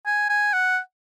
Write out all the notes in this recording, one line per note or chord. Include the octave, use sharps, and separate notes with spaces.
G#5
G#5
F#5